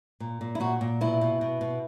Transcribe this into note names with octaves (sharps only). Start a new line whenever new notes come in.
A#2
A#2
E4
A#2 F#4
A#2
B2 E4
B2
B2
B2